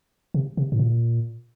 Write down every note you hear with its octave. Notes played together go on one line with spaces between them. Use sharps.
C3
C3
A2
A#2